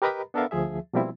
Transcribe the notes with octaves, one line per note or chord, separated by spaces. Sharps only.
G4 A#4 B4 D#5 A#5 B5
B3 D4 A4 A#4 E5 F5
D2 F3 G#4 E5
B2 F3 G3 A#3 C4 E4